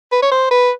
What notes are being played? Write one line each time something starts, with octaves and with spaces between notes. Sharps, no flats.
B4
C#5
C5
B4